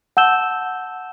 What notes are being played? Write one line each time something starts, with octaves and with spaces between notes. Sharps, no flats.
F#5 A5 E6 G6 E7 G7